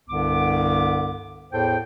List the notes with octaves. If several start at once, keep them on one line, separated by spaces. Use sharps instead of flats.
C2 G2 D3 B3 D6
E2 A2 A4 C5 G5